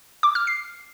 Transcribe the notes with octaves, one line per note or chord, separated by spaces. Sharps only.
D6
F6
C7